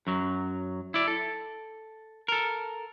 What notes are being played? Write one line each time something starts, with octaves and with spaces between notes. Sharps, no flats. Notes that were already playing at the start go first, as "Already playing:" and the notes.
F#2 F#3
E4 D5
A4
A4 A#4